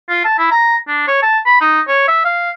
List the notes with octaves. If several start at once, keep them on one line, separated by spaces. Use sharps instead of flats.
F4
A5
E4
A#5
D4
C#5
A5
B5
D#4
C#5
E5
F5